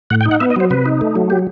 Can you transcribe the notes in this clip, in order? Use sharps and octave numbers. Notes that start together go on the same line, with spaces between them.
A2 F#5
G5
D#4
F#5
B3 E5
D#5
F#3 C5
C3 B4
D#4
A3
F#3
G4